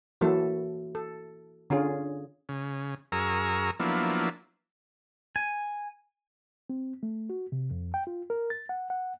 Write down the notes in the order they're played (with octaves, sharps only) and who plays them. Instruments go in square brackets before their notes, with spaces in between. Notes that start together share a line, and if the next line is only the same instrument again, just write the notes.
[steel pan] E3 F#3 A#3 E4 A4
A4
D3 C#4 F4 G#4
[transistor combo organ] C#3
F#2 G#4 A#4 A#5 C#6 E6
F3 F#3 A#3 B3 D4 E4
[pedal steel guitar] G#5
[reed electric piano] C4
A3
F#4
C3
F2
G5
F4
A#4
A6
F#5
F#5